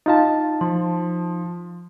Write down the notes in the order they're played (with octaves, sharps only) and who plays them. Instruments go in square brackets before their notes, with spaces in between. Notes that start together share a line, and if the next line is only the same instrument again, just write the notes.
[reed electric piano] D#4 F4 A5 [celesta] D#5 F5
[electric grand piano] F3 [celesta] C6